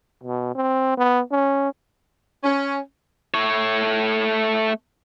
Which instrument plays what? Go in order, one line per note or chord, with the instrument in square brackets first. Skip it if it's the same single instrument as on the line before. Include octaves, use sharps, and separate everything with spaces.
[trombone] B2
C4
B3
C#4
[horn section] C#4
[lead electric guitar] A3 C#5